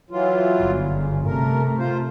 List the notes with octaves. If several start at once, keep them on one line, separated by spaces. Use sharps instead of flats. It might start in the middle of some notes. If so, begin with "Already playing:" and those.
E3 F#3 F4
G1
C#3
C3 A3 A#4
F4 C5